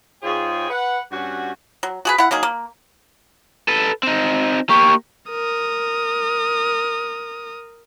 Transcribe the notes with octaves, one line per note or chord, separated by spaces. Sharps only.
G#2 F4 G#4 C#5 G5
B4 F#5
G2 C#4 F#4
F#3
F#4 G#4 B4
E4 F#5
F#3 A#3 D#4 G#4
A#3
A4 B4
C4 D#4
A#3 G4 C#6
A#4 D#6